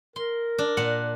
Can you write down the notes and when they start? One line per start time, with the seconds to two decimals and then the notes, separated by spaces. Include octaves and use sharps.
0.16 A#4 C6
0.58 D4
0.77 A#2 F#5